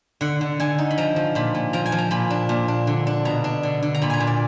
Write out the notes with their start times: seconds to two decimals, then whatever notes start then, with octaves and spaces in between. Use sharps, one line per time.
0.21 D3 F#5
0.41 D3
0.60 D3 G#5
0.78 D#4
0.91 B5
0.98 F3 A#5
1.16 F3
1.35 A#2 B5
1.55 A#2
1.73 F3 A#5
1.86 G#5
1.92 F3
1.98 A#5
2.11 A#2 B5
2.30 D4
2.49 A#2
2.68 D4
2.87 D3
3.07 D4
3.25 B2 A#5
3.44 D4
3.63 D3
3.83 D3
3.94 A#5
4.02 A#2 B5
4.10 G#5 A#5
4.20 A#2
4.27 D5